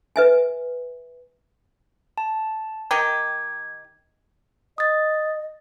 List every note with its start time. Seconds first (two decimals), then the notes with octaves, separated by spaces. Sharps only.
0.16 B4 E5 G#5
2.18 A5
2.91 D#3 D#4 G4 G#6
4.78 D#5 D#6 A6